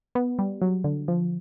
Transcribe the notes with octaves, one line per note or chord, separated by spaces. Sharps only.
B3
G3
F#3
D3
F3